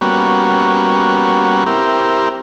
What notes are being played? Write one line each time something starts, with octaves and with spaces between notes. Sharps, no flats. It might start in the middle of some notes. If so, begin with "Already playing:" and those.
G3 A#3 B3 C#4 F#4
C4 E4 G4 A#4